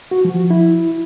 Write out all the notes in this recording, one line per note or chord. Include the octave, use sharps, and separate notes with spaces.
F#4
F3
E4